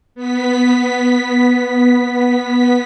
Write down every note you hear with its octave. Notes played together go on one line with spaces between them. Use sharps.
B3 B6